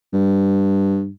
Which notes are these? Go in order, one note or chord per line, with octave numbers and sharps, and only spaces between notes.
G2